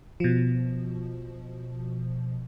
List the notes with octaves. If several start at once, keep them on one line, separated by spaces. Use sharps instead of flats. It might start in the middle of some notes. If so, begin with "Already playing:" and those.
B2 F3